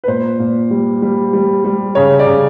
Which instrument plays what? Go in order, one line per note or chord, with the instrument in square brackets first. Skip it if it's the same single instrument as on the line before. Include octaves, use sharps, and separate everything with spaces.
[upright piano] B4
A#2 C5
A#2
G3
G3
G3
G3
C#3 C#5
D5
C#3